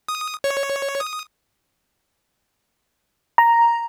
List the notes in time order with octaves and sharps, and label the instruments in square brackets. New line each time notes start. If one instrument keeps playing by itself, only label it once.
[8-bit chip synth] D#6
C#5
D#6
[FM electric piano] A#5